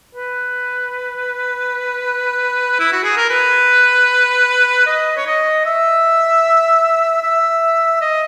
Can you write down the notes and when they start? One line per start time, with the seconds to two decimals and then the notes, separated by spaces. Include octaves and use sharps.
0.15 B4
2.79 E4
2.92 F#4
3.04 G#4
3.17 A#4
3.30 B4
4.86 D#5
5.17 C#5
5.27 D#5
5.65 E5
7.22 E5
8.01 D#5